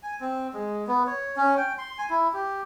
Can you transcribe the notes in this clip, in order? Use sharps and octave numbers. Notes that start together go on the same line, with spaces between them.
G#5
C4
G#3
B3
C#5
C#4
G5
C6
G#5
E4
G4